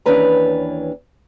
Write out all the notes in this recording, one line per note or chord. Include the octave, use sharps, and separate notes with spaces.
D#2 E3 C#4 D4 B4 A#5